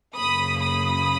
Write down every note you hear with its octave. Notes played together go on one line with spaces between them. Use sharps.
F#2 C#3 F#3 A#3 B5 D#6
B5 D#6